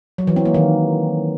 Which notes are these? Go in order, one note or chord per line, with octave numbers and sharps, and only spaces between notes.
F#3
E3
C4
A#3
D#3